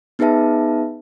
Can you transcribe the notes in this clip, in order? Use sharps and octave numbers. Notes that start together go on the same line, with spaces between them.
B3 D#4 G#4 B4 E5 A5